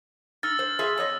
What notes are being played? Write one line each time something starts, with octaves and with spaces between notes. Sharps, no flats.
D#4 E6 F6 A6
C5
F4 G#4 E5
F2 C#5 D#5